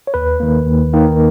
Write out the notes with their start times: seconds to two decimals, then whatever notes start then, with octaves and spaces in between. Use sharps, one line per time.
0.07 C#5
0.14 D#2 B4
0.40 D#3 A#3
0.66 D#2
0.93 D#3 A#3